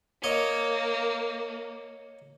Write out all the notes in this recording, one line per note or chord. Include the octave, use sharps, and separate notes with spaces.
A#3 C#5 D#5